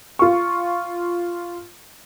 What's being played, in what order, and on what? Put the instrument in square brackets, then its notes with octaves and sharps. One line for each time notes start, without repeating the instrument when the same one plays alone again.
[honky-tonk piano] F4 C#6